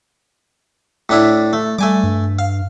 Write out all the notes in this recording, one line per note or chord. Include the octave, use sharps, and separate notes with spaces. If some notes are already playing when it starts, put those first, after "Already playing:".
A2 D4 E4
A3
G3 A3 G#5 D6
G2
F5